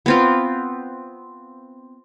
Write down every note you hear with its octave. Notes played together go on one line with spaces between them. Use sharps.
B3 C4 F4